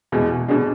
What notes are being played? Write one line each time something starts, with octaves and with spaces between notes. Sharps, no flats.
E2 B2 G#3
B2 G#3 D4